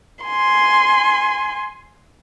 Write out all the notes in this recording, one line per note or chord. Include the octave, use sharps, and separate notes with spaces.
G#5 C6